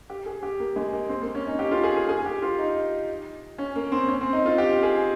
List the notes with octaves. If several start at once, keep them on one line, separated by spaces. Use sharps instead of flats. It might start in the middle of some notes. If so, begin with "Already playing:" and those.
G4
G#4
G4
A#3
G#3
A#3
C4
A#3
C#4
D#4
G4
F4
G#4
G#4
G#4
G4
F4
D#4
C#4
A#3
C4
C#4
C4
D#4
F4
G4
G#4